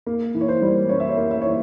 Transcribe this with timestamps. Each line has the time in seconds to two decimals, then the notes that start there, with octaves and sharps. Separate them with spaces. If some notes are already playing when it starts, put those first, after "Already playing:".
0.07 A#3
0.35 E3
0.41 C#5
0.48 C5
0.62 G3
0.89 C#4 C#5
1.00 E5
1.09 C#5
1.17 A#3
1.31 E5
1.42 E3 C#5